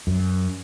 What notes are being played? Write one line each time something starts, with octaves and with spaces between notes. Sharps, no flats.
F#2